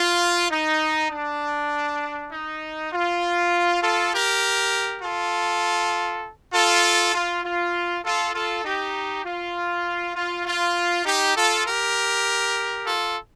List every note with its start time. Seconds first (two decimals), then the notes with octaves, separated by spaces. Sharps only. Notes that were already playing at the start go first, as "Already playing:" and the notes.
Already playing: F4
0.50 D#4
1.11 D4
2.31 D#4
2.92 F4
3.82 F4 A4
4.13 G4 A#4
5.02 F4 A4
6.53 F4 A4
7.14 F4
7.44 F4
8.05 F4 A4
8.35 F4 A4
8.65 D#4 G4
9.24 F4
10.15 F4
10.45 F4
11.05 D#4 G4
11.36 F4 A4
11.66 G4 A#4
12.86 F4 A4